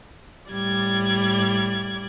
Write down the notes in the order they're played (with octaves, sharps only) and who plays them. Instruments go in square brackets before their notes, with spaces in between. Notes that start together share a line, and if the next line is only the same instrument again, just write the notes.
[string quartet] A2 G3 D5 G#6